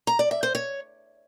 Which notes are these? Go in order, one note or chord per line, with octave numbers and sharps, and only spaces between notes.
A#5
D5
E5
C5
C#5